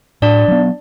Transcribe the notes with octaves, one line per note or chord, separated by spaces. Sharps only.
A2 D4 D5
F#3 B3